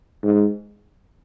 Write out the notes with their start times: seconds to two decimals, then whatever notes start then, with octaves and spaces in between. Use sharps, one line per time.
0.24 G#2